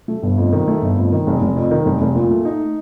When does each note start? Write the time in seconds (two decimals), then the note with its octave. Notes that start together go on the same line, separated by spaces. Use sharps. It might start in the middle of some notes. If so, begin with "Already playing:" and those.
0.08 A3
0.23 G1
0.37 F2
0.52 D#3
0.68 A3
0.82 G1
0.97 F2
1.12 D#3
1.27 F1
1.42 F1
1.56 F2
1.71 D#3
1.86 F1
2.01 F1
2.15 A#2
2.31 A3
2.45 D#4